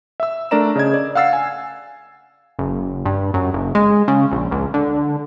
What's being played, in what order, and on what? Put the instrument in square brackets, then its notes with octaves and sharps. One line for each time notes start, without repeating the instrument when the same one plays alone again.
[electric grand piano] E5 E6
A3 D4 A#4 D5 A#5 E7
C#3 D#5 G#6
D5
F5 F#5 E6 A6 C7
G#5
[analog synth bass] F#1
G2
F#2
F#1
G#3
C#3
A#1
C#2
D3